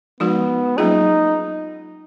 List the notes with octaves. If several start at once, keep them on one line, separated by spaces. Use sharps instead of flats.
F3 G#3 B3 D#4 F#4 A#4
F#3 A#3 C#4 D#4 F4 G#4